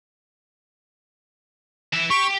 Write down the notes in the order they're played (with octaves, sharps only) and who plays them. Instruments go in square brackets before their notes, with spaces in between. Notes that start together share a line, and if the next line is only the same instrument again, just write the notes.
[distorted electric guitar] E3 E5
[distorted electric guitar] G4 [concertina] C#6